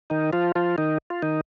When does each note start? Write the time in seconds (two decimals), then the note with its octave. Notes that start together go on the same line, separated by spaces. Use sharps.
0.10 D#3 D#4
0.33 F3 F4
0.56 F3 F4
0.78 D#3 D#4
1.10 F4
1.22 D#3 D#4